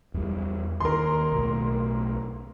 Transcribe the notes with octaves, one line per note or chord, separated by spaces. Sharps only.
E2 G3
D#2 A#4 C6
B1 A2